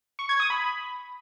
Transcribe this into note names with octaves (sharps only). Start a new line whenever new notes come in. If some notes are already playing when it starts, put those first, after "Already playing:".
C#6
G#6
D#6
B5